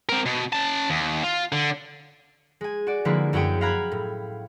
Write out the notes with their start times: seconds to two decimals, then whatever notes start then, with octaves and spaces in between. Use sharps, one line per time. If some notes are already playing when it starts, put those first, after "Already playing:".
0.09 C4 A#4
0.26 B2
0.52 C#4 A5
0.90 D#2
1.24 F4
1.52 D3
2.61 G#3 G#5
2.87 F#4 D5
3.05 D3 F3 G#3 A#3 E4 B4
3.33 F#2 E4 F#4 G#4 C#5 G5
3.61 F5 G5 A#5 B5 F#6 G#6
3.92 A2